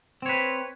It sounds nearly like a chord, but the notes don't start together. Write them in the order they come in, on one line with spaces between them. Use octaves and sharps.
C4 C#5 B4